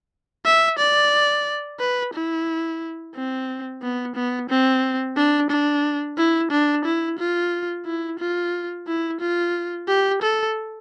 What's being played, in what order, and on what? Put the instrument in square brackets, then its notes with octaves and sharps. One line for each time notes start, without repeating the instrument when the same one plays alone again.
[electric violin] E5
D5
B4
E4
C4
B3
B3
C4
D4
D4
E4
D4
E4
F4
E4
F4
E4
F4
G4
A4